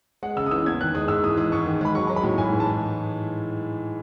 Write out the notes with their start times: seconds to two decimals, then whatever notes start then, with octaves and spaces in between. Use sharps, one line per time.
0.23 G#3 F#5
0.36 C#3 E6
0.46 D#6
0.51 E3 E6
0.66 E2 G#6
0.81 D#3 F#6
0.95 G#3 D#6
1.08 G#2 E6
1.24 E3 D#6
1.37 G#3 D#6
1.52 G#2 C#6
1.66 D#3
1.81 G#3 B5
1.95 F#3 C#6
2.07 F#3 C#6
2.16 B5
2.23 A2
2.38 G#2 G#5
2.53 E3
2.60 A5
2.66 G#3